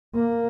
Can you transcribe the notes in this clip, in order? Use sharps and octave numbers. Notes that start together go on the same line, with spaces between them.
A#3